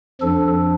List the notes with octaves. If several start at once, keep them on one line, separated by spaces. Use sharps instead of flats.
F2 F3 D4 A4